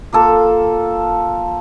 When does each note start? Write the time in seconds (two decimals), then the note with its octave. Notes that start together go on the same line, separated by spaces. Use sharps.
0.13 A#3 F4 A4